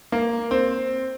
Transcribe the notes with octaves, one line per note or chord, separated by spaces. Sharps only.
A#3
C4